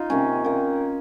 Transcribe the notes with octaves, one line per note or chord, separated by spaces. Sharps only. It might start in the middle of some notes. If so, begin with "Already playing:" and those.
Already playing: D#4 F4
C3 D#3 A#3 C#4
D#3 A#3